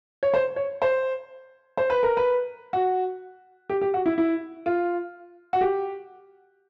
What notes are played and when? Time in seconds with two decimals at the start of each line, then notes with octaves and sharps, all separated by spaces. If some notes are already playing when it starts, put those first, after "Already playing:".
0.23 C#5
0.34 C5
0.56 C#5
0.82 C5
1.77 C5
1.90 B4
2.03 A#4
2.17 B4
2.73 F#4
3.70 G4
3.81 G4
3.94 F#4
4.06 E4
4.18 E4
4.66 F4
5.53 F#4
5.61 G4